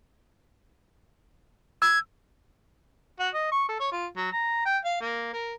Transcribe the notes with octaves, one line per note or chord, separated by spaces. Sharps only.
E6 G#6
F#4
D#5
C#6
A4
C#5
F4
F#3
A#5
G5
F5
A#3
A#4